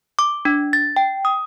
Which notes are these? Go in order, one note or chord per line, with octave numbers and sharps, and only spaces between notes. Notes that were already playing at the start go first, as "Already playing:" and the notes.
D6
D4
A6
G5
D#6